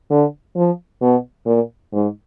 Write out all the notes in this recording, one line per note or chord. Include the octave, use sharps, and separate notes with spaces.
D3
F3
B2
A#2
G#2